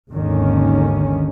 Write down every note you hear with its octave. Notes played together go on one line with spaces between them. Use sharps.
G#1 D#2 D3 D#3 C#4